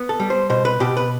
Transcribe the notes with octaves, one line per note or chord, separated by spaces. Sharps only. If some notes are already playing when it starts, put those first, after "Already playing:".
Already playing: B3
A4
G3
C5
B2 C5
B4
B2 G4
B4